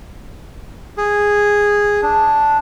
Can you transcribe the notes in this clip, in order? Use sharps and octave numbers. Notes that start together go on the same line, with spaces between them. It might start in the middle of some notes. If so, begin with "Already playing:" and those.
G#4
D4